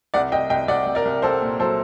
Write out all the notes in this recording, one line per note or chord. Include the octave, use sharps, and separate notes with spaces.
C2 D5 F#5
C2 D#5 G5
C2 D#5 G5
C2 D5 F#5
C2
A#4 D5
C2
C2 A4 C5
A#2
F#3 A4 C5